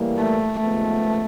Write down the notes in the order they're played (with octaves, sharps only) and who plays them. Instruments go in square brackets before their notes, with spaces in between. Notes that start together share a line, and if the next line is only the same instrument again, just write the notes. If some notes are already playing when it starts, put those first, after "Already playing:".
Already playing: [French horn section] A2 E3 G3 A#3
[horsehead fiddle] A3
[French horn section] D#2 C#3 F3 G#3 B3 [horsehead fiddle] A3